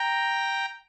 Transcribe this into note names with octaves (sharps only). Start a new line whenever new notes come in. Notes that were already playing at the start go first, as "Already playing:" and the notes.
Already playing: G5 A#5